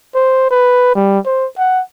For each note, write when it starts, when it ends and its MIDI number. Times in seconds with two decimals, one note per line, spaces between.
0.15 0.48 72
0.51 0.93 71
0.96 1.18 55
1.26 1.46 72
1.58 1.81 78